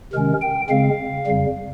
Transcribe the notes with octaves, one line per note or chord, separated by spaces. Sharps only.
C3 D#3 G#3 C#4 A#4
G5
C#3 G#3 C4 F5
F2 C#3 G3